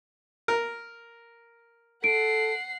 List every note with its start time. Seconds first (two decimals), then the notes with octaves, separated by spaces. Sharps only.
0.48 A#4
2.04 A4 F#5 C7 D7